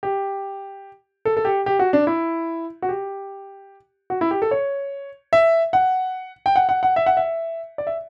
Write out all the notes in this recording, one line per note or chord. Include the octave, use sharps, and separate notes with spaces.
G4
A4
A4
G4
G4
F#4
D4
E4
F#4
G4
F#4
E4
G4
A4
C#5
E5
F#5
G5
F#5
F#5
F#5
E5
F#5
E5
D5
E5